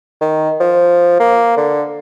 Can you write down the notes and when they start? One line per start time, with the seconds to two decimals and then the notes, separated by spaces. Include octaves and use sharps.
0.21 D#3
0.60 F3
1.20 A#3
1.57 D3